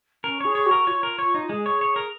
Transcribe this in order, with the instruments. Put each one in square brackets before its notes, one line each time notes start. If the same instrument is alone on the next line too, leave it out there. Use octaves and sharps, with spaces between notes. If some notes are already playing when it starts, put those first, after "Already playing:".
[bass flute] C#4 [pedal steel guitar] A#4
[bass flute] G#4 [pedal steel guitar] C#5
[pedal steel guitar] C#5
[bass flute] F#4
[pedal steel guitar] A#4
[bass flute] F4 [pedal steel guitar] C#5
[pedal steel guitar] A#4
C#5
D#4
[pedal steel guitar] G#3 [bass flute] G#4
[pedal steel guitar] C#5
C#5
A#4